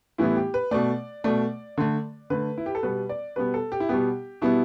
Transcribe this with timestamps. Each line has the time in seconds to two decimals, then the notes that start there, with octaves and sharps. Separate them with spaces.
0.18 A2 E3 G3 B3 E4
0.36 G4
0.54 B4
0.71 B2 A3 D5
1.24 B2 A3 D5
1.78 D3 A3
2.30 D3 A3 B4
2.58 E4
2.66 G4
2.75 A4
2.83 B2 G3 B3 B4
3.09 D5
3.36 B2 G3 B3 B4
3.54 A4
3.72 G4
3.80 E4
3.89 B2 G3 B3 G4
4.42 B2 G3 B3 E4